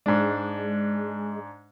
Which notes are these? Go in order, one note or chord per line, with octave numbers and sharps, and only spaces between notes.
G#2 G#3 D4